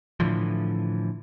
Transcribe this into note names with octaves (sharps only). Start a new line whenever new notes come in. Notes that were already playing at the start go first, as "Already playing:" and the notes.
A2 D3 E3 F3